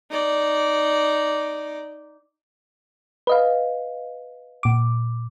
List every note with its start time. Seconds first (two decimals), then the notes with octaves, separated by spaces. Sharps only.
0.11 D#4 D5
3.27 B4 D#5 F5
4.63 A#2 D6